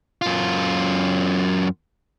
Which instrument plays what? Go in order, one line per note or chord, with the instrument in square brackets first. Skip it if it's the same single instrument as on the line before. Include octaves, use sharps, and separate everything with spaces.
[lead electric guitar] F#2 F4